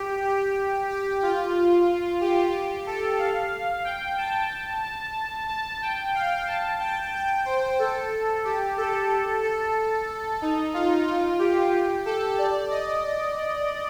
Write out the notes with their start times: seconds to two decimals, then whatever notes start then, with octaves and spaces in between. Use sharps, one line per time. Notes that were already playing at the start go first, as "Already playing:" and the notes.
Already playing: G4
0.25 G4
0.89 G4
1.23 F4
2.21 G4
2.87 A4
3.19 F5
3.85 G5
4.18 A5
4.84 A5
5.49 A5
5.82 G5
6.15 F5
6.47 A5
6.80 G5
7.14 G5
7.45 C5
7.79 A4
8.44 G4
8.77 A4
9.43 A4
10.42 D#4
10.74 F4
11.07 F4
11.39 G4
12.06 A4
12.38 D5
12.71 D#5